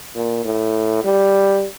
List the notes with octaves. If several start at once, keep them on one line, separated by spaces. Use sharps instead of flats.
A#2
A2
G3